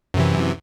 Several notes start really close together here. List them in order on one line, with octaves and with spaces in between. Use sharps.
F#2 C3 E3